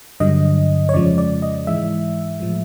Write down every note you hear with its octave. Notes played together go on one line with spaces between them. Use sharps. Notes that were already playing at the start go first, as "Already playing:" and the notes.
G2 D3 F#3 D#5
C#5
F2 C#3 F3 G#3 D5
D5
D#5
G#2 E3 G#3 E5
A2 F3 G#3